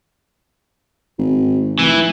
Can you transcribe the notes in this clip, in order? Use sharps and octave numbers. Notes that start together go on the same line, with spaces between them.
G#1
F1 E3